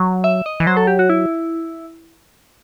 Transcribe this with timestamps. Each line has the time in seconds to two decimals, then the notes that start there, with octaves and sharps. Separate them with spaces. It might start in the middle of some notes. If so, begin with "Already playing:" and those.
Already playing: F#3
0.24 E5
0.46 D#5
0.60 E3
0.67 F#3 C5
0.77 A4
0.87 G4
0.99 F#4
1.10 E4